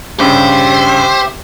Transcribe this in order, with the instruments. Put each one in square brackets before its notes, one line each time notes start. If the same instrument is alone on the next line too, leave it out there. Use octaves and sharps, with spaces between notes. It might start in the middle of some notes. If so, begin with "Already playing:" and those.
[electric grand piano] G2 C#3 [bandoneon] G4 E5 [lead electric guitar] C5